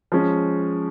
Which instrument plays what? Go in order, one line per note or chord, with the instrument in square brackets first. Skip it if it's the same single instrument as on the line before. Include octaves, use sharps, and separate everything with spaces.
[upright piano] F3 G#3 C#4